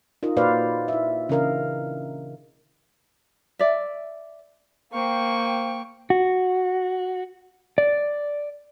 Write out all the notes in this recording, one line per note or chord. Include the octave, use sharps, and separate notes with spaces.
D#4 F4 A#4 D#5
A#2 F#4 B4 C5 D5 F5
E4 E5
C#3 E3 D4 A#4 D#5 F5
D5 E5
A#3 C5 F5 G5 C#6
F#4
D5